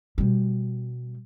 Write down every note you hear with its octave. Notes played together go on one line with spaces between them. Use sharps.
B2 G3